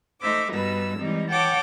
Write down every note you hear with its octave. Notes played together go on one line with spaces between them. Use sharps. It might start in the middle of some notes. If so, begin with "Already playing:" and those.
A3 D#4 C5 E5 D6
G2 B2 G3 D#4 B4 E6
E3 G3 G#3 C4 D#4
C#5 F#5 G5 A5 D6